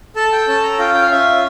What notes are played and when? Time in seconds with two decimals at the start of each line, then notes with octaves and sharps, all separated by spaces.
0.16 A4 A5
0.32 G5
0.47 C#4 A5
0.63 A#5
0.79 F4 G5
0.94 G5
1.02 F5
1.11 C#4 E5